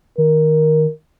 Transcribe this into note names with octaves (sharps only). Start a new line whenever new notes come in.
D#3 A#4